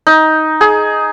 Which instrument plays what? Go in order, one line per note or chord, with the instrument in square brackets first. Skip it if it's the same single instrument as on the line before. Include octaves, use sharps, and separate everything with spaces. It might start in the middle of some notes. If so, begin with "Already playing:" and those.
[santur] D#4
G#4